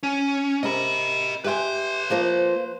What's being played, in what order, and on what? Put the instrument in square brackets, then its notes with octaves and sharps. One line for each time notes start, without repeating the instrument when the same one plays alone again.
[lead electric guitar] C#4
[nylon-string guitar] C3 A#4 [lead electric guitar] D#5 B5
[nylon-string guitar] G4 E5 G#5 [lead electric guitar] B4 C6
[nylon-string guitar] F3 A#3 C5